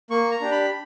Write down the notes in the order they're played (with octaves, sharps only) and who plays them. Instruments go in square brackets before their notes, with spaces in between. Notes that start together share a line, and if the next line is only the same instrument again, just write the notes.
[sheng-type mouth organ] A#3 C#6
A#5
D4 G4
B5